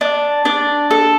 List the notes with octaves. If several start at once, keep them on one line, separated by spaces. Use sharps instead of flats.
D4
D4
A4